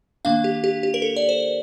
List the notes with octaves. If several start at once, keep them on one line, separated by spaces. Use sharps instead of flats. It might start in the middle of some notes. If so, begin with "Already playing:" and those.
D#3 A#3 D4 F5
G4
G4
G4
A#4
A4
D5
C5